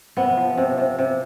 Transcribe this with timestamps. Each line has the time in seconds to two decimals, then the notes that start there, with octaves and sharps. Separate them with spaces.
0.17 C3 B3
0.37 F3
0.58 C3
0.78 C3
0.99 C3